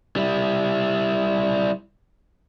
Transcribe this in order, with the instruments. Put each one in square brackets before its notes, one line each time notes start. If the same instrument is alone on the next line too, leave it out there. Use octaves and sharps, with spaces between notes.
[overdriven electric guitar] G3 E4